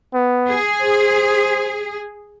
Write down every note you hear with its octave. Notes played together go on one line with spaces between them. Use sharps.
B3
G#4
C5